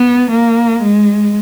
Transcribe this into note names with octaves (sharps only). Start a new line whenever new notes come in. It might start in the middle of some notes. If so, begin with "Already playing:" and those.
Already playing: B3
A#3
G#3